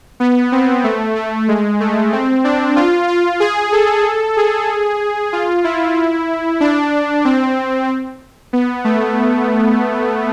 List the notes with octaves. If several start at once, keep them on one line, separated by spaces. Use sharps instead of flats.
B3
C4
A3
A3
G#3
A3
C4
D4
F4
F4
G#4
A4
G#4
F4
E4
D4
C4
B3
A3